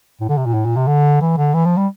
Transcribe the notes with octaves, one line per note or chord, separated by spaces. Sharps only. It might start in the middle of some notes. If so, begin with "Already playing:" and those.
A2
D3
C3
A#2
A2
A#2
C3
D3
E3
D3
E3
F3
G3